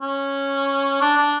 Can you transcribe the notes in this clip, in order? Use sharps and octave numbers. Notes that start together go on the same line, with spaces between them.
C#4
D4
D4